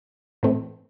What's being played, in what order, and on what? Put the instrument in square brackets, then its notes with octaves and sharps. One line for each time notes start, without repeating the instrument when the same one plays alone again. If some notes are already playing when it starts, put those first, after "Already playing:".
[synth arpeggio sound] A2 E3 A3 C4